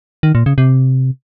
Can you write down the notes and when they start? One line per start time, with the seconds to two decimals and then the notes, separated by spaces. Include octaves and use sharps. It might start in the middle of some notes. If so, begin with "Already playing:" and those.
0.23 D#3
0.35 A#2
0.46 C#3
0.58 C3